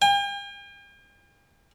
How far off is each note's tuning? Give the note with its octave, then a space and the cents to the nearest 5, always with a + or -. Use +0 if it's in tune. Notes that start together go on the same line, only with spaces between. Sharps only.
G5 +45